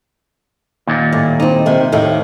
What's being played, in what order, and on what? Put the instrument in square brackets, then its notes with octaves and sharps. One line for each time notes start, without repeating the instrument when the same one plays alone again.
[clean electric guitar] D#2 A#2
[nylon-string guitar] A2
C4 D#4
C3 D#3
D#2 A2 D#3